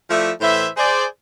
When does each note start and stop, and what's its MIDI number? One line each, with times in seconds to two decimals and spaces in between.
0.10 0.30 53
0.10 0.30 57
0.10 0.30 64
0.10 0.30 74
0.10 0.30 76
0.41 0.66 45
0.41 0.66 52
0.41 0.66 72
0.41 0.66 76
0.76 1.04 68
0.76 1.04 72
0.76 1.04 74